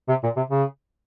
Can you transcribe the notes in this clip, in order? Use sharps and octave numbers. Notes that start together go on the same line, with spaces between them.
C3
A#2
C3
C#3